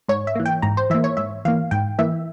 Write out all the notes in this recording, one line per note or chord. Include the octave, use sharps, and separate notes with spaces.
G#2 C#5
E5
E3 A#3
G5
G#2 A#5
C5
E3 A#3 E5
C#5
G#2 E5
E3 A#3 F5
G#2 G5
E3 A#3 E5